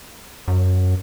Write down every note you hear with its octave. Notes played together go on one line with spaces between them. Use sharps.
F#2